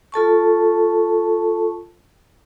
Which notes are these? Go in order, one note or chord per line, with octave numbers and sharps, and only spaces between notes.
F4 A4 A5 C#6